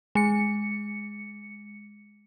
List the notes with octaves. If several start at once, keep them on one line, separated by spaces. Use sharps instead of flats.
G#3 C#7